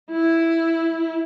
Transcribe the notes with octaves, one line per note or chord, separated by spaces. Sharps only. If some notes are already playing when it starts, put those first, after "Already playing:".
E4